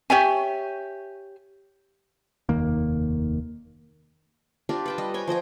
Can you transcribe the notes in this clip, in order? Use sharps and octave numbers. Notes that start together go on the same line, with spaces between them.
G4 C#5 E5 G#5
F1 D#2 D#3 A#3
D4 F4 G4 A#4
B4 G5 A5
G3 D#5
C#5 G5 G#5
F3 C5 D#5 G5